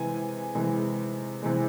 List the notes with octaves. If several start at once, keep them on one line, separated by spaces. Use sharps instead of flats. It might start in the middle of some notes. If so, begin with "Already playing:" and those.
Already playing: C3 E3 G#3 G#5
C3 E3 G#3
C3 E3 G#3